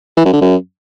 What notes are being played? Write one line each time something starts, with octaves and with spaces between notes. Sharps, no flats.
E3
F#2
D3
F#2